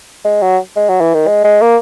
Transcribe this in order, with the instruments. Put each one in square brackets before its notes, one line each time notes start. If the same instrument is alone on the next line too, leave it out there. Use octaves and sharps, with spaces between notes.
[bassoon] G#3
F#3
G#3
F#3
E3
D#3
G#3
G#3
A#3